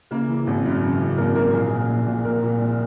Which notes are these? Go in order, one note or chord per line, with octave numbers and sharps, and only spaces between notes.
C#3 A#3 A#4
E3
G#1
F#2
C#3
E3
G#1 A#3 A#4
F#2 A#3 A#4
A#1 G#4
A#2
A#1
A#2
A#1 A#3 A#4
A#2
A#1